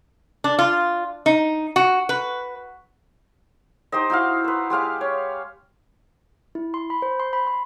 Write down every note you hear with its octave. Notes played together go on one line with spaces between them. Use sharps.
D4
F4
D#4
F#4
B4
D#4 G4 C5 D#5
D#4 E4 F#4 F5
B4 C5
G#3 G4 F5 D6
C#5
E4
C6
B5
C5
C6
B5
C6